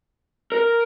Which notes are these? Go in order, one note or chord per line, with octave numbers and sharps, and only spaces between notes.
A#4